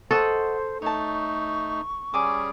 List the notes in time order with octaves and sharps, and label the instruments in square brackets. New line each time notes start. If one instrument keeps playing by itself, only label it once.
[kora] A4 [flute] C5 [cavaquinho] D#5 F#5 C#6
[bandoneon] A3 D#4 [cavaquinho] C#5 A5 [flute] C#6
[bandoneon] G3 C#4 G#4 [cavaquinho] D5 G#5 D6